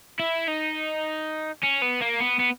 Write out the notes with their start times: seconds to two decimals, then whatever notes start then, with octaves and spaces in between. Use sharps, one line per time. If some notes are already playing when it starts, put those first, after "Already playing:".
0.19 E4
0.48 D#4
1.63 C#4
1.81 B3
2.01 A#3
2.20 B3
2.39 B3